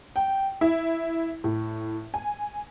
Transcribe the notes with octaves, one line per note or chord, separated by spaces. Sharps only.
G5
E4
A2
G#5